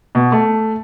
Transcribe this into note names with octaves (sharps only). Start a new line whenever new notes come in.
B2
A3